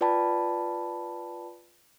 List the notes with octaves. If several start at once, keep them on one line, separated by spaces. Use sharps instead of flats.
F4 B4 D5 G5 A5 B5